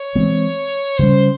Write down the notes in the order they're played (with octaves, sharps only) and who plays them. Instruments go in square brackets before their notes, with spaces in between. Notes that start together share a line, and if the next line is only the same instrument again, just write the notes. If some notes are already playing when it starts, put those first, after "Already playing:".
Already playing: [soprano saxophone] C#5
[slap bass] E3 G#3 C4
[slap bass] C#3 G3 C#4 [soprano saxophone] C5